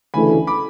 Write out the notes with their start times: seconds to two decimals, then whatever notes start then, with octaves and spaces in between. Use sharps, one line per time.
0.14 D2 C#3 E3 A3 G#5 B5
0.47 B5 D6